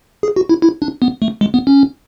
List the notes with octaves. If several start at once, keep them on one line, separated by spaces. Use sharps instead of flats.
G#4
F#4
E4
E4
D4
B3
A3
G#3
B3
C#4